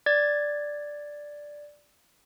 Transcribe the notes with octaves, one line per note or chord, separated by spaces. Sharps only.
D5 G#6 A6